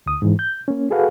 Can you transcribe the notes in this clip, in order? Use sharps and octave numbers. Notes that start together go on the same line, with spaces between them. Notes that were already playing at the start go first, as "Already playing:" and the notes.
D2 D#6
G#2 E3
G6
A#3 C#4
F#4 G#4 A4 B4 F5 F#5